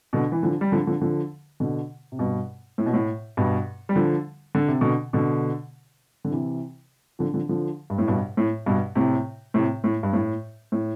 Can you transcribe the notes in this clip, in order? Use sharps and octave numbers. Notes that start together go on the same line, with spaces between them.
B2 D3
E3
D3 F3
G3
D3 F3
D3 F3
D3 F3
B2 D3
C3
G2 B2
A2
B2
A2
G2 B2
G3
D3 F3
D3
C3
B2 D3
B2 D3
D3
C3 E3
D3 F3
D3 F3
D3 F3
G2
A2
G2 B2
A2
G2 B2
A2 C3
A2 C3
A2
G2
A2
A2